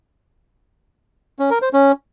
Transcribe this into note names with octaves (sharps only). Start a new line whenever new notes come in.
C#4
A#4
C5
C#4